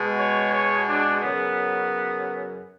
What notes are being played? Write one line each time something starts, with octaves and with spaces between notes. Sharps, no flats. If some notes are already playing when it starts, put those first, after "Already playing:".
Already playing: B2 G#3
C#5
C#5
D4
F#2 C#3 F#3 B3